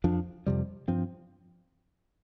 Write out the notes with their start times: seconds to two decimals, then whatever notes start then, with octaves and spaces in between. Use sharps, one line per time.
0.04 F2 F3 D4
0.46 F2 C3 G3
0.88 G2 F3 C4